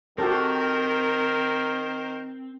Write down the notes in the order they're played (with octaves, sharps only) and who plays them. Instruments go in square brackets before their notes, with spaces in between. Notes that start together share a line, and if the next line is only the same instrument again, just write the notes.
[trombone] D#3 [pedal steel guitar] C4 [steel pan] F#4 G4 A4 [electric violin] A#4 C5